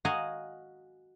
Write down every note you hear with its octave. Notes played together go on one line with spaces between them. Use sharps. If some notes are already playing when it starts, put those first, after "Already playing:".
F#4 D#5 F5 F#5 G#5 A#5